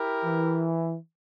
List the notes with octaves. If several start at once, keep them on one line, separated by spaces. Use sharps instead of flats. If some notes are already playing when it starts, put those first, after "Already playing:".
Already playing: E4 G4 A#4
E3